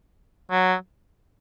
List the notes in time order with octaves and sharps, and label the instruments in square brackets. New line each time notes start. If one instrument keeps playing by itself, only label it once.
[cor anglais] F#3